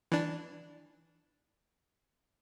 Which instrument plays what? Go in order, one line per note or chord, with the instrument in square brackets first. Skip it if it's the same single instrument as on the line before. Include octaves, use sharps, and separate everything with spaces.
[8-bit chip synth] E3 D4